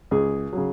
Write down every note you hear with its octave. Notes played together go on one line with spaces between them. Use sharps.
C#2 G#4
C#3 F#3